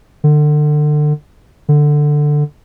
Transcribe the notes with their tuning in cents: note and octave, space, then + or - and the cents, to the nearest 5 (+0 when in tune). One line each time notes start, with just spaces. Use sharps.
D3 +30
D3 +10